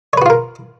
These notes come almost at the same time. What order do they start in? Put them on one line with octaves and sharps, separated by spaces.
C#5 B4 F#4 F4 A#4